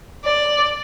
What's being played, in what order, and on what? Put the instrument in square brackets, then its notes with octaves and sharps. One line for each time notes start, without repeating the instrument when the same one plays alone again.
[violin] D5